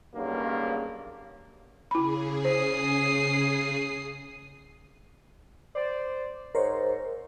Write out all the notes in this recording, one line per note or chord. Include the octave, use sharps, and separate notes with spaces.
B1 G2 C#3 F#3 A#3
C#3 E4 G#4 B5
C5 D#6 C7
C5 D5
G#2 A#4 C5 C#5